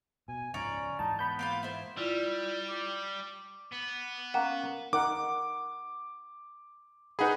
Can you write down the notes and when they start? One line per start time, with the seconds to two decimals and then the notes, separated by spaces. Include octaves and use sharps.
0.28 B2 G#5
0.54 C#2 G#2 F3 C#4 D5 A#5 C#6
0.99 G#2 E3 G#3 D#4 A5
1.19 B3 B5 G6
1.39 A#3 F4 F5
1.63 E4 C5
1.97 G3 E4 F4 D5
2.68 D6
3.73 B3
4.34 A#3 C#4 F#5
4.93 D#4 A#4 F#5 D6
7.19 D#4 G#4 B4 F#5 B5